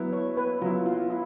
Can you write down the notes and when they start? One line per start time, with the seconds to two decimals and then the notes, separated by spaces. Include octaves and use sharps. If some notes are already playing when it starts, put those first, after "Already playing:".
Already playing: F#3 B3 E4
0.13 C#5
0.37 B4
0.61 F#3 B3 E4 F4
0.86 F4
1.10 E4